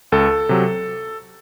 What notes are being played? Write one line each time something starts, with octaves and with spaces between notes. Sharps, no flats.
C#2 A4
C3 F#3